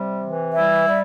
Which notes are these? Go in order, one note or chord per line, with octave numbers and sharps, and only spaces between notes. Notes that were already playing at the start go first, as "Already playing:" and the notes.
Already playing: C3 G3
E3
G3 E4 E5
G3